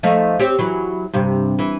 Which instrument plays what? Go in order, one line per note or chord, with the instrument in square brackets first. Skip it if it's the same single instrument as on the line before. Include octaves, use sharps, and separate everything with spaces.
[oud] F3 A3 D#4
C4 G4 C#5
E3 F#3
G2 C3
E3